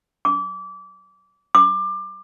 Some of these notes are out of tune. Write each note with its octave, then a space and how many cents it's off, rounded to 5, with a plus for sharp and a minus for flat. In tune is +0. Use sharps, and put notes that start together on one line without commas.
D6 -25
D6 +25